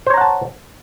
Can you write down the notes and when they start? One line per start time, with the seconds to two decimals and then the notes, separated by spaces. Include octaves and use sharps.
0.07 C5
0.10 C#5
0.14 A#5
0.17 F#5
0.21 A5